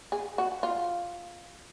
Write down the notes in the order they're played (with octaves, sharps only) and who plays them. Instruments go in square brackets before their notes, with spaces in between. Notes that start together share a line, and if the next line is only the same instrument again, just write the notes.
[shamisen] G#4
F#4
F4